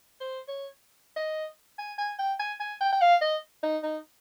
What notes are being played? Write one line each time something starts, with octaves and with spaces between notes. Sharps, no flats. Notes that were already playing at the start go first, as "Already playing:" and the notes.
C5
C#5
D#5
G#5
G#5
G5
G#5
G#5
G5
G5
F5
D#5
D#4
D#4